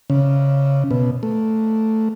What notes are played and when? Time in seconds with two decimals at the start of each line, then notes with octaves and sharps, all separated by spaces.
0.10 C#3
0.91 B2
1.23 A3